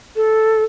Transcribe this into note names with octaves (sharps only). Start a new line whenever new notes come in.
A4